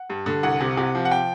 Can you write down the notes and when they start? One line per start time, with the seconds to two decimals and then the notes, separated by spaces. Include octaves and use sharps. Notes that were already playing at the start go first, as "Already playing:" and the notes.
Already playing: F#5
0.10 G2
0.26 D3
0.43 C2 F#5
0.60 C3
0.77 C3
0.95 F3
1.05 F#5
1.11 G5